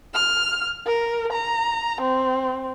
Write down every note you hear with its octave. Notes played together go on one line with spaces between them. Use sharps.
F6
A#4
A#5
C4